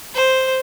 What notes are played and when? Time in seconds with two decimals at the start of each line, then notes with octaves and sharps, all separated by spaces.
0.14 C5